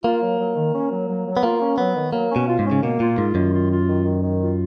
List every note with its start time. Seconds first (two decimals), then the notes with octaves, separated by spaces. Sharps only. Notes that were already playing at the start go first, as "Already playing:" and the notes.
0.04 A#3 F4
0.22 F#3
0.39 F#3
0.56 D#3
0.73 C#4
0.91 F#3
1.08 F#3
1.26 F#3
1.37 B3
1.43 A#3 F4
1.61 C#4
1.78 F#3 B3
1.96 D#3
2.13 F#3 A#3
2.31 B2 C#4
2.48 F4
2.59 G#2
2.66 C#4
2.71 C#3
2.83 B2 A#3
3.00 A#2 F4
3.18 G#2 F4
3.35 F#2 D#3
3.53 F4
3.70 F4
3.87 D#3
4.04 D#3
4.22 D#3
4.40 F4